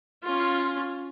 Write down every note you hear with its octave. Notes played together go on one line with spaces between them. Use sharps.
C#4 F4